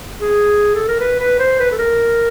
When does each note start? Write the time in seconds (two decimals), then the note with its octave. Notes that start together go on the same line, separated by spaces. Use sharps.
0.21 G#4
0.75 A4
0.88 A#4
1.00 B4
1.20 B4
1.39 C5
1.60 B4
1.72 A4
1.78 A#4